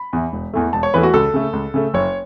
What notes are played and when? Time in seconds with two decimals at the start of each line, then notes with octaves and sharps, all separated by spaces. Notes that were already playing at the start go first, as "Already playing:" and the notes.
Already playing: B5
0.13 E2 E3
0.33 E1
0.53 E2 E3 A3
0.73 E1 A5
0.83 C#5
0.94 E2 E3 A3 B4
1.03 F#4
1.13 C#2 A4
1.34 C#3 A3
1.53 C#2
1.74 C#3 A3
1.94 F#1 C#5